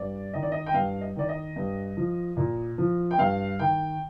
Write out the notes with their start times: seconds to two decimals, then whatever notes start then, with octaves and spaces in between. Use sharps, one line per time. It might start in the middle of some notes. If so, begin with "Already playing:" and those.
Already playing: G2 D5
0.33 D#3 D#5
0.43 D5
0.52 D#5
0.66 G5
0.74 G2 F5
1.01 D#5
1.16 D#3 D5
1.29 D#5
1.56 G2
1.97 F3
2.37 A#2
2.78 F3
3.11 G5
3.18 G2 F5
3.59 D#3 G5